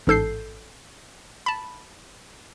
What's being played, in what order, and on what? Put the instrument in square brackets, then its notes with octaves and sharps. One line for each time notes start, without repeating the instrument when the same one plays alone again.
[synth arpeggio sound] A1 G#2 A4 G6 C7
A5 B5